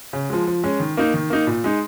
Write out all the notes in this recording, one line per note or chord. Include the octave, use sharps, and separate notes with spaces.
C#3
F3 G#3
F3
G#3 C#4
D#3
A#3 D#4
D#3
A#3 D#4
A#2
G#3 D#4